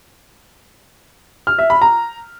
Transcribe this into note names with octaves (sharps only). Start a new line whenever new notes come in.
F6
E5
B5
A#5